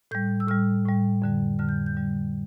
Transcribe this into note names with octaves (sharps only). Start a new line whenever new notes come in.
A2 G3 G6
E6
A2 G3 F6
A2 G3
F2 D3 G3
F2 D3 G3 F6
G6
G6
F2 D3 G3